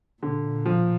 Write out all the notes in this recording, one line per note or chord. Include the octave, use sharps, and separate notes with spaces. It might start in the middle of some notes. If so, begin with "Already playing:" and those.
A#2 D3
F3